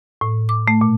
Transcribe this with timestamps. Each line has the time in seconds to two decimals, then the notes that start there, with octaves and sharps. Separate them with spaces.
0.21 A2
0.49 D6
0.68 A3
0.81 A#2